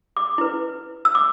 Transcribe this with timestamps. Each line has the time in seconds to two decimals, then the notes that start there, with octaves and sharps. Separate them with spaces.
0.17 D6
0.38 E4 B4
1.05 E6
1.15 D6